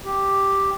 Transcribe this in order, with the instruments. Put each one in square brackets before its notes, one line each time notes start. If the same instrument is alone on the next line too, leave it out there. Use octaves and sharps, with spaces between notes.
[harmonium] G4